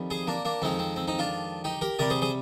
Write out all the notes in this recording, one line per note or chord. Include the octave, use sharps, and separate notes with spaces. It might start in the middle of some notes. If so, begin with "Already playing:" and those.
Already playing: F2 D#3 G3
G#4 C5
A#3 D4
A#3 D4
F2 D#3 G#3 C4
C4
C4
C4 D#4
D4 F4
D#4 G4
G4 A#4
C3 G3 A#4 D5
G#4 C5
G#4 C5